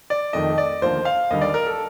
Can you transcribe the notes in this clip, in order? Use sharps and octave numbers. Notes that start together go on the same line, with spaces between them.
D5
F1 F2 D#3 A3 D#5
D5
D#2 D3 F3 A#3 C5
F5
D#2 D3 G3 D#5
D5
A#4
A4